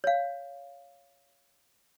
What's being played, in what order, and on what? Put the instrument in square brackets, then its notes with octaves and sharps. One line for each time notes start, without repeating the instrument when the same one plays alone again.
[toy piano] C#5 F5